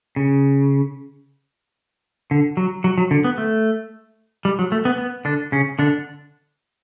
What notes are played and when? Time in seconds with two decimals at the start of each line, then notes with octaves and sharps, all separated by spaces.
0.16 C#3
2.31 D3
2.57 F#3
2.84 F#3
2.98 F#3
3.11 D3
3.24 B3
3.38 A3
4.45 G3
4.59 F#3
4.72 A3
4.85 B3
4.98 B3
5.25 D3 D4
5.52 C#3 C#4
5.79 D3 D4